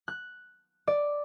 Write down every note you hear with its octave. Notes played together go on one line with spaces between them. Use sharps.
F#6
D5